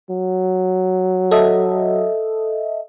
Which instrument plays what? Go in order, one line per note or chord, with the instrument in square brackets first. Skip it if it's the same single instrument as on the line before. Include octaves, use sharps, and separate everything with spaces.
[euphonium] F#3
[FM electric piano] A4 D#5 E5